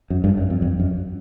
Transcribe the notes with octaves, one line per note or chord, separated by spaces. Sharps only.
F#2
G2
F#2
F2
F2
F#2